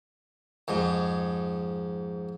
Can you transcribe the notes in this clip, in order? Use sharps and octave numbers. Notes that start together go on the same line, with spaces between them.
F2 G#2